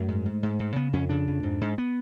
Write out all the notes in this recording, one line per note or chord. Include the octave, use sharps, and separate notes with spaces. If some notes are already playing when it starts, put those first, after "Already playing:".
Already playing: F#2 A3
G#2
G#2
G#2
G#2
C#3 B3
F2 C#4
C#3 D4
F2
G#2
G#2
B3